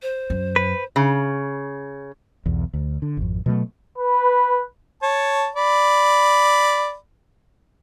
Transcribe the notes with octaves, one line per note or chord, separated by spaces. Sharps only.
C5
F#2
B4
C#3
B1 E2
D2
D3
G#1 F2
B2 F#3 G#3 A3
B4
C#5 A5
D5 B5